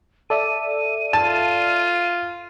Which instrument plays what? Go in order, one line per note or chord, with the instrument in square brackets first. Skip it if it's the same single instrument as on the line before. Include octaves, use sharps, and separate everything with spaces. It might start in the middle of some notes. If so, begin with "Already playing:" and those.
[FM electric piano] A4 D5 E5 [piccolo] D#7
[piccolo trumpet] F4 [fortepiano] A5